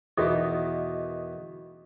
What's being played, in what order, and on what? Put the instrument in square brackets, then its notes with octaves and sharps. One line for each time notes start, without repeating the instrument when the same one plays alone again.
[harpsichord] E2 B2 D#3